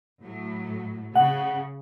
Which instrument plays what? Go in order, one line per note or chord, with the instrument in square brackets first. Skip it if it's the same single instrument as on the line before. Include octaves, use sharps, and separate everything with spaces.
[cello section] A2 F#3
[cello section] C#3 [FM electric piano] F#5